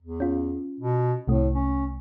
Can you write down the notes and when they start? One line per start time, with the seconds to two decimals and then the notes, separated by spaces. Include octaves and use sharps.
0.02 E2
0.20 C#4 F4
0.80 B2
1.28 C2 A2 C3 A3
1.54 C#4